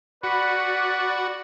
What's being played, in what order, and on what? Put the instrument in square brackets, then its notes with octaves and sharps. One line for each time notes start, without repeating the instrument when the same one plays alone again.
[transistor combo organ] F#4 [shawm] B4 [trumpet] D5 [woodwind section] B5 C#6